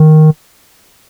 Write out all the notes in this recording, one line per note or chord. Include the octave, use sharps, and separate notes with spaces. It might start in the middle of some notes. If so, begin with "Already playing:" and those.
Already playing: D#3